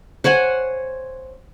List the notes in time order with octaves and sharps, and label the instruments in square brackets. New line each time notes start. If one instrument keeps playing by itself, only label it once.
[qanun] C5 C#5 F#5 G#5